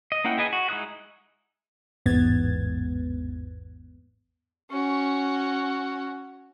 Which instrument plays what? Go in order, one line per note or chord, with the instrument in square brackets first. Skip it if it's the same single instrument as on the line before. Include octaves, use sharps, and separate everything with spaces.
[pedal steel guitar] D#5
A#3 C#4 E4 F#5 G5
E4 G#4 B4 D#5 G#5
F#4
G#3 D#4 E4 D#6 F#6
[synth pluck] A1 E2 G#2 B3 G#6 A6
[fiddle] C#4 F#4